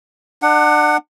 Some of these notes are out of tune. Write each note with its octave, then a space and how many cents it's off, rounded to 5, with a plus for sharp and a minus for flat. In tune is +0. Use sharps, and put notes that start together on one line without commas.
D4 +35 F#5 +0